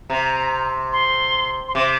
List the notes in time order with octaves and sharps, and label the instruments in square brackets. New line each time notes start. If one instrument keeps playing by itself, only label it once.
[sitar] C3 [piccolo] A#5
[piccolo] C6
C6
[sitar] C3 [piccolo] D6